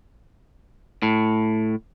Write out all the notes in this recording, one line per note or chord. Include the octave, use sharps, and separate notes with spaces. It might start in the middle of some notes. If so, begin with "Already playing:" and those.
A2